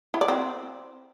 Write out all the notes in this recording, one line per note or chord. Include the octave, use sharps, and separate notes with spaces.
E4
D5
C4